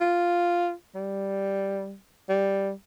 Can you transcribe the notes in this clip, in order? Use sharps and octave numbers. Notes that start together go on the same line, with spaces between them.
F4
G3
G3